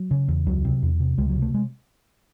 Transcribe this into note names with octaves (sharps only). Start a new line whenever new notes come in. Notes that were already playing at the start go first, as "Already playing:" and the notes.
Already playing: F#3
C#3
E2
C#2 F#3
C3
E2
C3
C#2 G#3
F#3
C3
A3
G#3